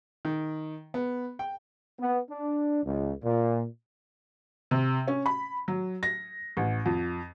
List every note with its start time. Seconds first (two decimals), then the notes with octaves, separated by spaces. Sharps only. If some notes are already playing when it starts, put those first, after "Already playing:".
0.25 D#3
0.94 B3
1.39 G5
2.00 B3
2.30 D4
2.84 C#2
3.24 A#2
4.71 C3
5.08 C#4
5.26 B5
5.68 F#3
6.03 A#6
6.57 A1
6.86 F2